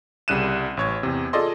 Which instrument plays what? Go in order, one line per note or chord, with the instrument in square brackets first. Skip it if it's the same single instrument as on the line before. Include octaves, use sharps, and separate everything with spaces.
[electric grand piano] C2 C#3 G3 F#6 D#7 E7
A1 C#5 G#6
E2 C3
F4 G#4 A4 D5 D#5 C6